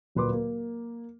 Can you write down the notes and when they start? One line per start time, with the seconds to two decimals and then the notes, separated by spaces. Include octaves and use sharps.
0.15 D1 A#2 B4 C6 D6
0.32 A#3